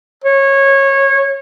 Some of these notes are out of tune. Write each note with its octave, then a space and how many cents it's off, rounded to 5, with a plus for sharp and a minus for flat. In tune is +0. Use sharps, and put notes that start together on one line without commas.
C#5 -20